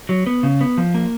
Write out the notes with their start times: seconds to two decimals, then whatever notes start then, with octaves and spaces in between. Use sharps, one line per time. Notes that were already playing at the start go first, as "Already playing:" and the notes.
0.09 F#3
0.27 B3
0.43 C#3
0.61 B3
0.78 F3
0.94 A#3